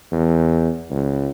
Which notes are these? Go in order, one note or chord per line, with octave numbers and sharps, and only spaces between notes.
E2
C#2